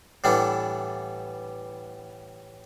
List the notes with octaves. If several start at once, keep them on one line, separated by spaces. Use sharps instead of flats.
A2 E3 G3 B3 D4